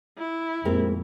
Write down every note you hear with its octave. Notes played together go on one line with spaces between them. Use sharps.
E4
F2 A#2 G#3 A#3 C4 G4 A#4